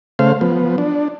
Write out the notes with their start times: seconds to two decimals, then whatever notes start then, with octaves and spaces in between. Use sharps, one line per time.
0.19 C#3 A3 C5 F5
0.41 F3 B3
0.78 D4